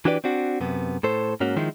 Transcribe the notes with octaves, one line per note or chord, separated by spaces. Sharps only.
E3 D4 F#4 G4 B4 D5
C4 D4 F#4
F#2 C3 B3
A2 A4 C5
G#2 A#3 C#4 F#4
D#3 F3 G#3 E4